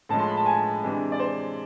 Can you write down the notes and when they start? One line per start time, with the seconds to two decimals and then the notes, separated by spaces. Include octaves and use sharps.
0.09 A2 F3 G#3 A5
0.19 C6
0.28 B5
0.37 A5
0.46 G#5
0.83 C3 E3 G#3 D4
1.12 D5
1.19 C5